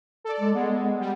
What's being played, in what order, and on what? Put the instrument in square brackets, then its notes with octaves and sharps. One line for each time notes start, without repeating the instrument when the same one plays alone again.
[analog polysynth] A4 D5
[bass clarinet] G#3
[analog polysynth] G#3 [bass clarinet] B3
[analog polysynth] G3